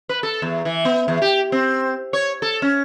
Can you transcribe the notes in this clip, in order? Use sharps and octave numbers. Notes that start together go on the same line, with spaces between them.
B4
A4
E2
E3
B3
E2
G4
C4
C#5
A4
C#4